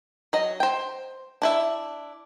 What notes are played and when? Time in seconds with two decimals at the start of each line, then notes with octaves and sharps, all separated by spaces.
0.33 F#3 D#5
0.60 C5 G5
1.42 D4 E4 E5